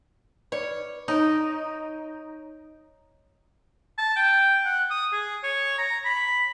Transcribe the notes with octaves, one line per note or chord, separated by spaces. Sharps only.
B4 C#5 D5
D#4 C#5 A#5 D7
A5
G5
F#5
D#6
G#4
C#5
A#5
B5